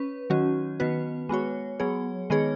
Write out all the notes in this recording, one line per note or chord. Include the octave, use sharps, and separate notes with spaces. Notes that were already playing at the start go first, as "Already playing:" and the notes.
Already playing: C#4 B4
D#3 F#3 C#4 F#4
D#3 B3 F#4 B4
G#3 B3 F#4 C#5
F#3 B3 G#4 C#5
D#3 G#3 B3 G#4 C#5